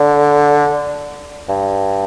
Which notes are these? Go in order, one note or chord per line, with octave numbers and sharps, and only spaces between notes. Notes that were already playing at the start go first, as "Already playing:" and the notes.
Already playing: D3
G2